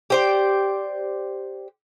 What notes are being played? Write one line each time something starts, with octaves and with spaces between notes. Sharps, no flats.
G4 C5 D5